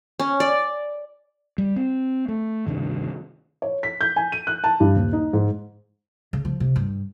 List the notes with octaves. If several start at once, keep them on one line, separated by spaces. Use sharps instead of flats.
C#4
D5
G3
C4
A3
D2 G2 C3 D#3
C#5
B6
G6
G#5
D#7
F#6
A5
G2
D#1
D#4
G#2
C#3
F3
C3
G2